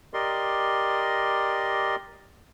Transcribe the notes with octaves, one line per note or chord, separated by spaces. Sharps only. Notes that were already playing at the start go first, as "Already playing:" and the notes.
G4 A#4 D5 D#5 C6